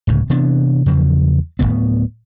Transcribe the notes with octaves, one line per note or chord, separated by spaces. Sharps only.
D1 C#2 A2
C3 E3 B3 D4
E2 C#3 F3 F#3
D1 E2 A2 B3